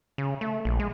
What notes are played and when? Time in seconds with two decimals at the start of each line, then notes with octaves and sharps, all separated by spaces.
0.18 C#3
0.41 A3
0.65 A#1
0.79 G#3